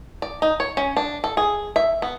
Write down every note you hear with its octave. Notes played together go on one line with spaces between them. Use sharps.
D5
D#4
C#5
C#4
D4
A4
G#4
E5
B3